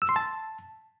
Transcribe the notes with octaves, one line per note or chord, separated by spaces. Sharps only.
E6
C6
A5